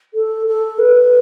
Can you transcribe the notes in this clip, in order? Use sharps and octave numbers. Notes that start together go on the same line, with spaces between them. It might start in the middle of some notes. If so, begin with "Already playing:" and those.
A4
A4
B4